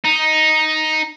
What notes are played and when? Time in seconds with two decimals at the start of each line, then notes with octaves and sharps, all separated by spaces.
0.05 D#4